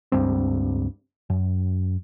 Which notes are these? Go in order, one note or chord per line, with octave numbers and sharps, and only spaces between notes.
C#2 G2 G3 C4
F#2